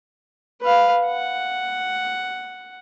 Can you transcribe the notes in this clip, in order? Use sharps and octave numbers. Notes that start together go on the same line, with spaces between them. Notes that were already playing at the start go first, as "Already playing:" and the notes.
B4 F5
F#5